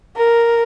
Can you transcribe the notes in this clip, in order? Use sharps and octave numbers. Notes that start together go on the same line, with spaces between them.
A#4